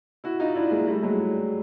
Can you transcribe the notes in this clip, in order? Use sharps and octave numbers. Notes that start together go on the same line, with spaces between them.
E4 F#4
D#4 F4
D4 E4
G#3 A#3
G3 A3
F#3 G#3